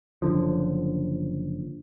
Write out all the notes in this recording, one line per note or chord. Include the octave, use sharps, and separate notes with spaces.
F#1 B1 D3 F3